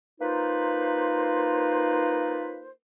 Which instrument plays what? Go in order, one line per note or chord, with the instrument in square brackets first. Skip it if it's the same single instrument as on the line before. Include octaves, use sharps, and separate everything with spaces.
[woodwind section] A#3 D#4 F4 B4 C5